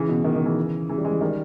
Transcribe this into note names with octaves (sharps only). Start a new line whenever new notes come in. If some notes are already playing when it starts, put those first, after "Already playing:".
Already playing: C#3 E3
B2
B2 D#3
B2 D#3
C#3 E3
C#3 E3
G3
E3 G#3
D#3 G3